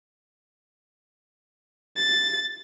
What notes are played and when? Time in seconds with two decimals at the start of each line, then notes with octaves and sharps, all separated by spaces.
1.97 A6